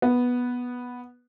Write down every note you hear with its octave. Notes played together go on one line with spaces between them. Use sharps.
B3